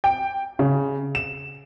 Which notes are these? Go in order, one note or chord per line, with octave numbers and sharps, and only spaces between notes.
G5
C#3
E7